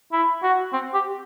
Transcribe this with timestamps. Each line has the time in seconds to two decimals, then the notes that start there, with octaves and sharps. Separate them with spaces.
0.12 E4
0.43 F#4
0.73 C4
0.94 G4